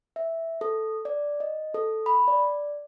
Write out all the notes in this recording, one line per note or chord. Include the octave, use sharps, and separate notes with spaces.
E5
A4
D5
D#5
A4
B5
D5